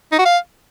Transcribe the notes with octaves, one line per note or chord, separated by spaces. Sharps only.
D#4
F#4
F5